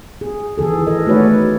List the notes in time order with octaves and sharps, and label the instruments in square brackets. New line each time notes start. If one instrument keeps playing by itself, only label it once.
[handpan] G#4
D#3 E3 G#4 A4
A4 A#4 D#5
A3 D#4 F#4 B4 C#5 D5